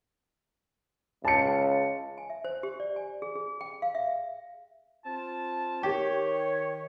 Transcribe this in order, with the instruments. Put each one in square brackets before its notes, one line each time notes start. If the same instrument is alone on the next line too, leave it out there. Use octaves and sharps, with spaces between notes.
[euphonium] C#2 [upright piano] A5 C#7
[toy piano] G#5
E5
C5
G4
D5
G#5
G#4
G#4
G5
F5
E5
[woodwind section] C4 F4 A5
[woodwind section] D#3 C#5 [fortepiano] G4